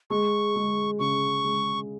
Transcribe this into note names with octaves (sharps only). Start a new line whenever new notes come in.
G#3 C#6
G#3
C#3 C#6
G#3